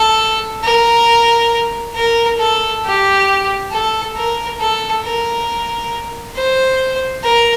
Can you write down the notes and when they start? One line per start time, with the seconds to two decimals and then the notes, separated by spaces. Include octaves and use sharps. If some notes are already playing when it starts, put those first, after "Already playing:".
Already playing: A4
0.64 A#4
1.95 A#4
2.39 A4
2.84 G4
3.72 A4
4.16 A#4
4.60 A4
5.04 A#4
6.35 C5
7.24 A#4